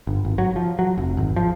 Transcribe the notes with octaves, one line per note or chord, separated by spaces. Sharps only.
G1
G#1
F#3
F3
F#3
F1
G#1
F3